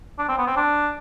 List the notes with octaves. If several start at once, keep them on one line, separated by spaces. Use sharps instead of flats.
D4
C4
B3
C4
D4